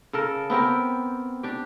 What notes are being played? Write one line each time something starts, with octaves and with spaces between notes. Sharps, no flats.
C#3 A4 A#4
B3 C4 G4 A#4
D4 G4